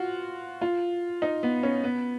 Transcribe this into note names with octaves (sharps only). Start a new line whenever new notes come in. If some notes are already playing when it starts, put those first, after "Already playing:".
Already playing: F4 F#4
F4
D#4
B3
C#4
B3